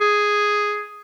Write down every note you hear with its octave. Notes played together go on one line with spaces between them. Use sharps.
G#4